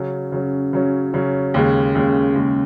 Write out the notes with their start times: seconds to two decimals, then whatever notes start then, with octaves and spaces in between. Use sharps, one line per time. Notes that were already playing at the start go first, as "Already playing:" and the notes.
Already playing: C#3 F#3 C#4
0.32 C#3 F#3 C#4
0.73 C#3 F#3 C#4
1.14 C#3 F#3 C#4
1.54 D#2 C#3 G#3
1.95 D#2 C#3 G#3
2.35 D#2 C#3 G#3